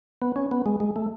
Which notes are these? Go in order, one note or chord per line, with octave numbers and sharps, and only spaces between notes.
B3
C#4
B3
G#3
G#3
A3